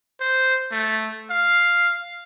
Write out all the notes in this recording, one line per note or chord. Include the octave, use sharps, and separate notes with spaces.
C5
A3
F5